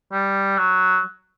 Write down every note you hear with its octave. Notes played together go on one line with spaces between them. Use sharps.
G3
F#3